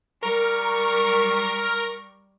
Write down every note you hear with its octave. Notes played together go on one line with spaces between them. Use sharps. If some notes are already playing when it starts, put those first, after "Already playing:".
G3 A#4 C#6